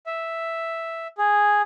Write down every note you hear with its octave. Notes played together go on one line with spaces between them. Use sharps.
E5
G#4